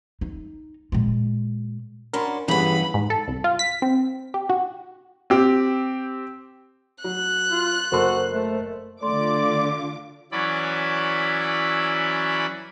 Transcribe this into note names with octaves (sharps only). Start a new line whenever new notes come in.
D#4
A#2 G#3
C#4 D4 F#4 A#4 B5 C6
G2 E3 B3 C#4 G4 G#4 B5
G#2
A4
C2
F4
B6
C4
G4
F#4
C4 G4
F#3 F#6
F4
F#1 F#4 A4 A#4 C5 C6
A3
D3 A3 F4 D5 C6 D6
E3 F#3 C#4 E4 D5 B5